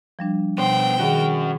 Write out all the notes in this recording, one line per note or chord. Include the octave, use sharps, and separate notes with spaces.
F3 G3 D4
B2 B3 C5 G5
D#3 C#4 F#4 G#4